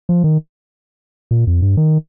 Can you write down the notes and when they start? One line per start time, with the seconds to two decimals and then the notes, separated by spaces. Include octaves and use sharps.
0.09 F3
0.24 D#3
1.31 A#2
1.47 F2
1.62 G2
1.77 D#3